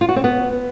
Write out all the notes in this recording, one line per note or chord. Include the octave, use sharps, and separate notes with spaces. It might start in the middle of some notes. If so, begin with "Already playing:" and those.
F4
F#4
C4
B3